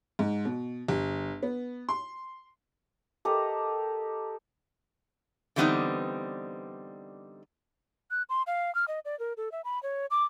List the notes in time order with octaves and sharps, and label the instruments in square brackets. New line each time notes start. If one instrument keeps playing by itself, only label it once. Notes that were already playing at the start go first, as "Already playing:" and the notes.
[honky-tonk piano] G#2
B2
G1
B3
C6
[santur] G4 A4 A#4 D#5
[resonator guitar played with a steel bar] D3 E3 G3 B3 C4 D#4
[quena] F#6
C6
F5
F6
D#5
D5
A#4
A4
E5
B5
C#5
D6